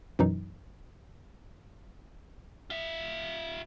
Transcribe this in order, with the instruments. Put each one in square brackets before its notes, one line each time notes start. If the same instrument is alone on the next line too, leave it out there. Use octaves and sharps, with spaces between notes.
[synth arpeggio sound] F#2 B2 E3 F#3 D#4
[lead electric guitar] F4 E5